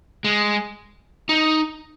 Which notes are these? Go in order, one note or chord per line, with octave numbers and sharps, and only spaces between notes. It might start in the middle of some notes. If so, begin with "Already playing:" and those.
G#3
D#4